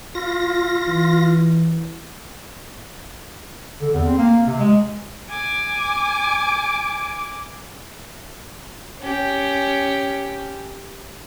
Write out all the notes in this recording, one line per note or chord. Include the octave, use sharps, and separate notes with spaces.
F4 A#6
E3
D3
E2
C4
A#3
C3
G#3
G#5 D6
C#4 G4